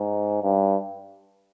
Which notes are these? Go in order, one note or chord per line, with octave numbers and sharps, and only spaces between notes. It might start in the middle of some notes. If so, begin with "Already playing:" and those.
Already playing: G#2
G2